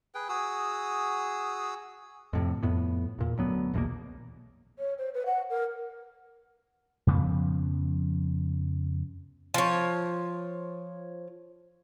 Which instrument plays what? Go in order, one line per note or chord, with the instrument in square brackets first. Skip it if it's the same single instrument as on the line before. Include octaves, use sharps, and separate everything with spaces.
[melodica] G#4 B4 G5
F#4 G#4 D#6 E6
[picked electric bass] F2 A2 C3
F2 A2 B3
E2 A#2
D1 D2 F#3 B3
A#1 E2 B2 A#3
[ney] C#5
C5
B4
F#5
A#4
[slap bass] F2 C#3 F3 B3
[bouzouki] F3 C#5